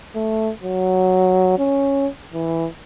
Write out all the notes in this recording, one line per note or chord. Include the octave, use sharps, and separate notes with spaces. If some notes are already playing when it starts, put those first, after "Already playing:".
A3
F#3
C#4
E3